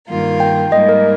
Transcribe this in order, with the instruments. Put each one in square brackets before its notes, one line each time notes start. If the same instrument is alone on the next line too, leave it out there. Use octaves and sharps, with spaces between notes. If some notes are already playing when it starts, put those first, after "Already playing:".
[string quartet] G2 D#3 A#3 F4 A#4
[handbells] G5
[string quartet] G#2 G3 A#3 [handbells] D#5
[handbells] A#4